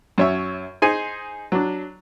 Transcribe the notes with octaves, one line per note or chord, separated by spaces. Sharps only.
F#2 C#5 E5
D#4 G#4 C5 G#5
F#3 D4